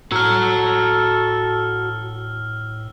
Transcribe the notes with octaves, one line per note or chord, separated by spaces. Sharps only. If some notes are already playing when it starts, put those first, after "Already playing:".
A2 F#4 A4 A#5 E6 F6